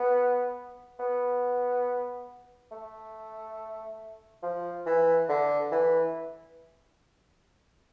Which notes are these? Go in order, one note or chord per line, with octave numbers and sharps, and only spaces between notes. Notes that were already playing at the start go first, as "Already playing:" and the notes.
Already playing: B3
B3
A3
F3
E3
D3
E3